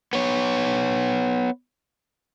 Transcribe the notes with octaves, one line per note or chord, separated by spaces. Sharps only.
B3 C#5